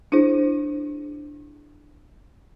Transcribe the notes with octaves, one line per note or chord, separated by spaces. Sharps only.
D4 E4 G#4 C5